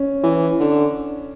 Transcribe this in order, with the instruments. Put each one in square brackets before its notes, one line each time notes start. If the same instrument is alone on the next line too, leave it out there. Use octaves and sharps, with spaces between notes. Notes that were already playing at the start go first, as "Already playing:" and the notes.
Already playing: [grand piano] C#4
[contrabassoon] E3
D3